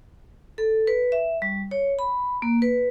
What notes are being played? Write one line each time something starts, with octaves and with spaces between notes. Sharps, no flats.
A4
B4
E5
G3
C#5
B5
A#3
B4